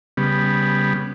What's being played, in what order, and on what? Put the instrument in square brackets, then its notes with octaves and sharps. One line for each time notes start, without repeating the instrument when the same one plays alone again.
[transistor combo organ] C#3 G3 B3